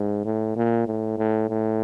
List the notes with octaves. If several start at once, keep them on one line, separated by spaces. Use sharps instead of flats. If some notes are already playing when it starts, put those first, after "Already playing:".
Already playing: G#2
A2
A#2
A2
A2
A2